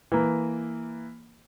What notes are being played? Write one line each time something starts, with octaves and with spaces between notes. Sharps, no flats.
E3 A#3